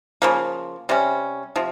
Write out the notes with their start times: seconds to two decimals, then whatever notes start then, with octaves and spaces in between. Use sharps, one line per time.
0.22 C#3 F3 A#3
0.89 C3 G3 C#4
1.56 C3 F3